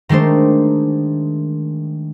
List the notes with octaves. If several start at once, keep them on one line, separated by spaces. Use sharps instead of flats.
D#3 G#3 A3 D4 C5